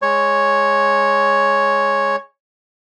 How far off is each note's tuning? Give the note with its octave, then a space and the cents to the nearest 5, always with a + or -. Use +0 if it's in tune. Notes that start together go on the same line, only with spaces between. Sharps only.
G#3 +0 C#5 +0